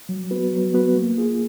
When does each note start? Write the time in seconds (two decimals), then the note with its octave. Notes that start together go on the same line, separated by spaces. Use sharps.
0.09 F#3
0.31 B3 F#4 B4
0.53 F#3
0.74 B3 F#4 B4
0.96 A#3
1.18 F4 G#4